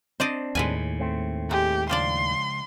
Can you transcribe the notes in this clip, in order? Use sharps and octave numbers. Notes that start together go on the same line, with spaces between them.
C4 D4 C5 D5 D#5
D#2 A2 G#3 B4 G#5
A3 C4
G#3 G4
C#2 F3 D4 D5 C6